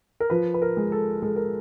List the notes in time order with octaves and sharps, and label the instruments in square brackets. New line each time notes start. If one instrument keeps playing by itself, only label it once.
[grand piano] A#4
F3 B4
B4
A#4
G#3
A4
G#3 A4
A#4